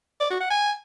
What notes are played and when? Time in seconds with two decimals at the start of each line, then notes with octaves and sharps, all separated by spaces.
0.20 D5
0.31 F#4
0.41 F#5
0.51 G#5